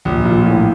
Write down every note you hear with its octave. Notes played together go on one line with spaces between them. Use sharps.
A#1
A#2
A2